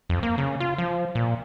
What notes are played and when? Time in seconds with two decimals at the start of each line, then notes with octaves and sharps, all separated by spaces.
0.09 F2
0.23 A#3
0.38 C#3
0.60 F4
0.78 F3
1.15 A#2